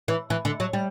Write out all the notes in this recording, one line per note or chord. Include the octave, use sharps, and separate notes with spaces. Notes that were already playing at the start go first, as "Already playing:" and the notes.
E3
E3
D3
F#3
G3